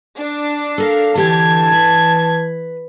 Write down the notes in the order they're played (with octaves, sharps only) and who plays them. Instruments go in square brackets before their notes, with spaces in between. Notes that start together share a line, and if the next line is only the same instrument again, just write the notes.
[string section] D4
[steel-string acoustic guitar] A4 A#4 F5
[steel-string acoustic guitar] D3 G4 [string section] E3 G#6 [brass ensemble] A5
[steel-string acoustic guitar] B4